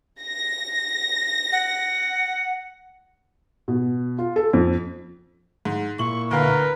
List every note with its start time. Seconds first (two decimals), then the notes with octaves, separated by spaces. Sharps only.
0.22 A#6
1.52 F#5
3.68 B2
4.19 F4
4.36 A4
4.53 F2
5.65 G#2
5.99 A#2 E4 C#6 F#7
6.31 D2 A#4 B4 F5